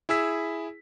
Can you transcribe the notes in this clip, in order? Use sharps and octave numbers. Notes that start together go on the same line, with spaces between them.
E4 G#4 E6 B6